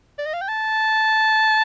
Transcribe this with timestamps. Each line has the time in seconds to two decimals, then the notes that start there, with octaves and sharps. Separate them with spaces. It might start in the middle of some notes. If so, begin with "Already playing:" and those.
0.18 D5
0.26 D#5
0.34 F5
0.41 G5
0.48 A5